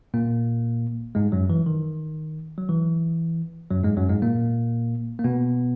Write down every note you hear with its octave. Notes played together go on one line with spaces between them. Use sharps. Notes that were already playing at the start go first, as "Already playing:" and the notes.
A#2 A#3
G#2 G#3
F#2 F#3
E3
D#3
F#3
E3
F#2 F#3
G#2 G#3
F#2 F#3
G#2 G#3
A#2 A#3
A#3
B2 B3